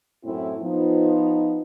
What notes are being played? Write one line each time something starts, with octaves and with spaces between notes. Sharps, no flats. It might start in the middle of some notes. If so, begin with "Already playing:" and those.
F#2 A2 C4 E4
F3 B3 D#4